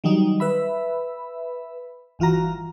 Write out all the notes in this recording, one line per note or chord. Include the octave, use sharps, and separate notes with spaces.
D#3 F#3 G3 D#4
B4 E5 B5
G1 E3 F4 F#4 A#5